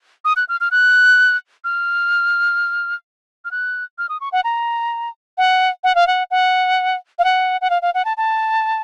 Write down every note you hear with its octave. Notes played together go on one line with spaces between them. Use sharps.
D#6
F#6
F6
F6
F#6
F6
F6
F#6
F6
D#6
C#6
F#5
A#5
F#5
F#5
F5
F#5
F#5
F5
F#5
F#5
F5
F5
F#5
A5
A5